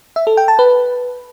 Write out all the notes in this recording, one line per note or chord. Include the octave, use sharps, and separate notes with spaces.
E5
A4
G5
A5
B4